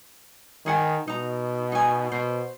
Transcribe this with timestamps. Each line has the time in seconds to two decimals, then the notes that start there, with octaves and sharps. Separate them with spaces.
0.66 D#3 G#4 F#5 G#5
1.07 B2 D#4 A#5
1.72 D#4 G#5
2.12 B2 C5